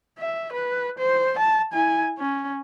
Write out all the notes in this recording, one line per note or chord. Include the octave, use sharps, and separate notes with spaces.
E5
B4
C5
A5
E4 G#5
C#4